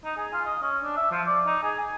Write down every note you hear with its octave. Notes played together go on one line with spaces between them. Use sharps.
D#4
G#4
F4
D#5
C#4
D4
E5
F3
D5
D#4
G#4
G#4